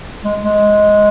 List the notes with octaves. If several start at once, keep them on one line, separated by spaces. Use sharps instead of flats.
G#3
G#3